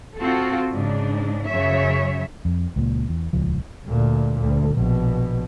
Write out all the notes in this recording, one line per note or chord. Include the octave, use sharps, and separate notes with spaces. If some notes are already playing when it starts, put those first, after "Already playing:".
C4 F4 F#4 A4
G#2 C#3 D4
F#2 C#3 C#5 E5
F2
C#2 A#2
E2
D#1 C#2 F3
D2 A#2
D2
A#1 B2